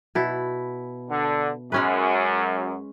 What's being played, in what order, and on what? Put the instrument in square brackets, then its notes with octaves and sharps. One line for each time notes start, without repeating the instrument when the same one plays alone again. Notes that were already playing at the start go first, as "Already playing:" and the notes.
[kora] B2 E4
[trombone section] D3
[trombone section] F#2 [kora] G#3 C#4 B4